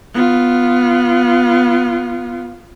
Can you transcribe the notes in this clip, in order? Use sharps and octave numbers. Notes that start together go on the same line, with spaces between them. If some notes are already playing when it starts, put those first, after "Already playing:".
B3 F4